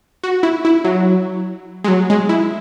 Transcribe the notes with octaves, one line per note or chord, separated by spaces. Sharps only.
F#4
E4
E4
F#3
G#3
F#3
G#3
E4